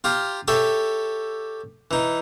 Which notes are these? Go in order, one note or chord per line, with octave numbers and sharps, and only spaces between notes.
F4 G4 F5 A#5
G4 A4 C#5 E5
E3 D#4